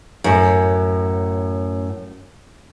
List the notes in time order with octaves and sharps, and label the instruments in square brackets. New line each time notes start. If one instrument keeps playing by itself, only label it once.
[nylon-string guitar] F#2 A2